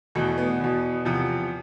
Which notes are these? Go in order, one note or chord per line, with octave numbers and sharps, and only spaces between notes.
E2 B2 A3
B3
E2 B2
E2 C3 F3